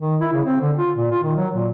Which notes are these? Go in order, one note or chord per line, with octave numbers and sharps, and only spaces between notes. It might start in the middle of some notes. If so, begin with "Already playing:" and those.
D#3
E4
C#3
C4
D3
F4
A#2
F4
D#3
F#3
A#2